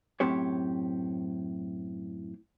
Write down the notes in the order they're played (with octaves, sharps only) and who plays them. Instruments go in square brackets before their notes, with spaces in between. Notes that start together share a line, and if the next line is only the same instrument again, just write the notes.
[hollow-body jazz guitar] F#2 A2 C4 G4 C#5